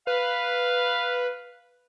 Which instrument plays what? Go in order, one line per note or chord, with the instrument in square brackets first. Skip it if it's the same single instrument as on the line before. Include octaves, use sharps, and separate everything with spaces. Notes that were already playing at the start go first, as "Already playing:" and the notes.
[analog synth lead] B4 [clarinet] F5